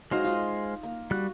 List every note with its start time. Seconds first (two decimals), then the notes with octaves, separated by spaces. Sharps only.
0.11 F#3 G#3 D#4 F#4 C5 F5
0.24 F4 D#5
0.83 A#3
1.11 G3 F#4 F#6